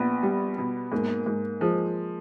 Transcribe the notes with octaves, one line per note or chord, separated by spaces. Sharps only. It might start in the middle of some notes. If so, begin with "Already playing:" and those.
Already playing: A#1 B3
G3
B2
G#2 A#3
G#2
F3 G#3